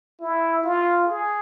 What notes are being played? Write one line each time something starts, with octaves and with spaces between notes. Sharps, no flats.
E4
F4
G#4